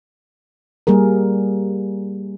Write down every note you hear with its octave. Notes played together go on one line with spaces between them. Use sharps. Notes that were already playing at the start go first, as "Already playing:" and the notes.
G3 A#3 G#4 A#4